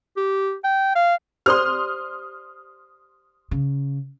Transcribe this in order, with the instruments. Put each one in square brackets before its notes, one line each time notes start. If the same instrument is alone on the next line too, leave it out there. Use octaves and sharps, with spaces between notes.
[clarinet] G4
G5
F5
[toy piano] G4 C5 D5 [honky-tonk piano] C6 D#6 F6
[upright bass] C#3